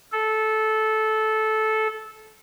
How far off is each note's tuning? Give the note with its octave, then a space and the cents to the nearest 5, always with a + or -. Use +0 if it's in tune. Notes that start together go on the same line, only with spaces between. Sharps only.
A4 -15